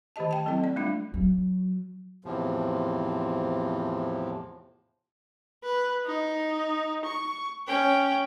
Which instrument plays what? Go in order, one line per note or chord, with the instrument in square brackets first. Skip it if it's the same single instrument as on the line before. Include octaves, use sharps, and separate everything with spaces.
[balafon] D#3 A3 G4 D#5 A5
G5 A5
F#3 C4 E4 A4 D#5
A3 D5
G3 A3 D4 F4 E5
[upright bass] F#3
[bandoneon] E2 A2 C3 F3
[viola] B4
D#4
C#6
C#4 G5